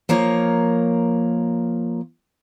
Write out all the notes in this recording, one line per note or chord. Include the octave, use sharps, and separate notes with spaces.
F3 A#3 A#4 C#5